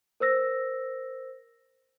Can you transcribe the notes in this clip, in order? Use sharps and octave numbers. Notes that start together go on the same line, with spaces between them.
A#4 C5 E6 A#6